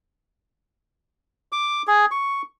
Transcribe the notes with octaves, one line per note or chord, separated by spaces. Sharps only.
D6
G#4
C#6